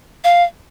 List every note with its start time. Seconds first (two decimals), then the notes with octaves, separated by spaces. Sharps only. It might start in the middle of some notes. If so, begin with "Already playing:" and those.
0.24 F5